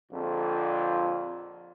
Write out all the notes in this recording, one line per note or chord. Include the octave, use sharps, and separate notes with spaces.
A#1 F2 D3 F4